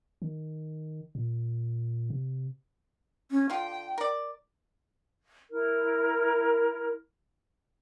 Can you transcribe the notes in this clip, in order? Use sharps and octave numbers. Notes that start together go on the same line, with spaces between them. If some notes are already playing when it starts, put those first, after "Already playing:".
D#3
A#2
C3
C#4
D3 F4 G5
A#4 D5
E4 A#4